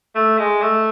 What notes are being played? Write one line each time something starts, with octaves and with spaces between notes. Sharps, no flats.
A3
G#3
A3